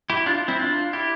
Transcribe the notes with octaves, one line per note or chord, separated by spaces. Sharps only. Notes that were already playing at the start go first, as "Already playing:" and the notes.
E4 G4
D4 F4
C4 E4
D4 F4
E4 G4